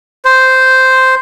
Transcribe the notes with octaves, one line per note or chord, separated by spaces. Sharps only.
C5